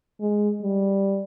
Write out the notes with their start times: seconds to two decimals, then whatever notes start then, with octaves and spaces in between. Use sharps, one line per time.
0.20 G#3
0.62 G3